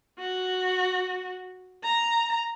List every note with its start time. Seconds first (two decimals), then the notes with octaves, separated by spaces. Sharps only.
0.19 F#4
1.84 A#5